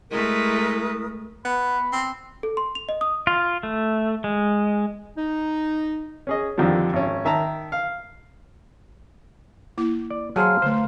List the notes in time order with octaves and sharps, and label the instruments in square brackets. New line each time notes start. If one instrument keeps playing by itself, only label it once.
[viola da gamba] G#3 A3 B4 [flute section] E4 A#4 D#6
[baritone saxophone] B3 [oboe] B5
[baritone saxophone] C4
[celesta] A4
C6
F7
D#5
D#6
[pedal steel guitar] F4
A3
G#3
[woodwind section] D#4
[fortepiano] C#4 G#4 D#5
F2 D3 D#3 F3 G3
G#1 C#4
D#3 E5 A5 A#5
F5
[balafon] A#3 E4 D6
[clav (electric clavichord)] D5
[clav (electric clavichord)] F#3 G#4 C5 [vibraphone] F5 A#5 C6 [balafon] A5 [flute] F6
[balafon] D3 A3 [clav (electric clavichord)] C5